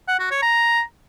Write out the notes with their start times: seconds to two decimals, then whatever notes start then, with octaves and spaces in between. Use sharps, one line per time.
0.08 F#5
0.20 F#4
0.31 C#5
0.43 A#5